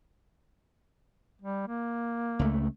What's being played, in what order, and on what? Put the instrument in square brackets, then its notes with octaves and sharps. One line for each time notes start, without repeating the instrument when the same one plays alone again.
[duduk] G3
A#3
[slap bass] C#2 A3